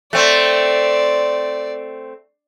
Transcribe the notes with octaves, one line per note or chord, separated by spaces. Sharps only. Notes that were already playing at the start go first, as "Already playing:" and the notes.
A3 C4 D5